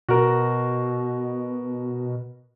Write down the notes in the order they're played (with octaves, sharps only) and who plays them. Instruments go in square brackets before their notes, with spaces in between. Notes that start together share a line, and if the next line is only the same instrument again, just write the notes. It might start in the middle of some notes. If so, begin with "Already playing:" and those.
[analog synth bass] B2 [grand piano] F#4 A#4